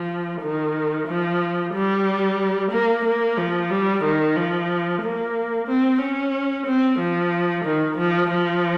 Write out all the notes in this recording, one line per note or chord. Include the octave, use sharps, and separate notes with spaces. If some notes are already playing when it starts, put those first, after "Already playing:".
Already playing: F3
D#3
F3
G3
A#3
A#3
F3
G3
D#3
F3
A#3
C4
C#4
C4
F3
D#3
F3
F3